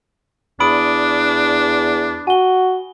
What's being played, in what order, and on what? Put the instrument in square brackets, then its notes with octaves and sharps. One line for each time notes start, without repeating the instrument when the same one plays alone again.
[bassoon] E2 [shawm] D4 [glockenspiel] B5 D#6 D7
[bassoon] F#4 [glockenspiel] G#5 G7